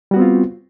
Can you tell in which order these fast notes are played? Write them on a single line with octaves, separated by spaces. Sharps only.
G3 F#4 B3 C4 F4